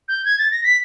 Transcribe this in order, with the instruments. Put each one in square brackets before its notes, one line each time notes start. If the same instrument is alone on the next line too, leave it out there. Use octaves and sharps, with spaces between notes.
[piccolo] G6
G#6
A6
A#6
B6